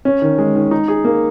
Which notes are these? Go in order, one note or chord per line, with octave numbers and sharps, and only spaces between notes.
C#4
D#3
G#3
D#3
D#4
G#4
A#3